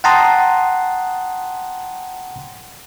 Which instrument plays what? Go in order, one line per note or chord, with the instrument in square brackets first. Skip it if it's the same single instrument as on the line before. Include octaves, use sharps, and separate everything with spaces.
[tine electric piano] F#5 G5 A5 A#5 C6 D#6